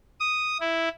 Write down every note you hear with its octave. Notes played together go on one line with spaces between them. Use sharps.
D#6
E4